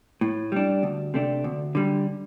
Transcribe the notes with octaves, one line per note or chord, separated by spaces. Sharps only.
A2
G3 D4
D2
C3 A3 D4
D2
D3 G3